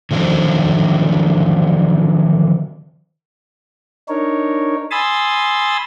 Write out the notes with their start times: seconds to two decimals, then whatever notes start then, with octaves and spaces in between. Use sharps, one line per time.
0.11 D3 D#3 F3 F#3 C4
4.09 D4 D#4 A#4 C#5
4.91 G#5 B5 C6 D#6 E6 A6